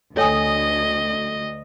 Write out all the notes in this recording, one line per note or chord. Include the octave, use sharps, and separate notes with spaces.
D2 A4 C#5 D#5 G5 G#5 D#6